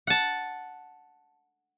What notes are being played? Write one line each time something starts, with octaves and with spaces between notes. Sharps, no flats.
F#5 A5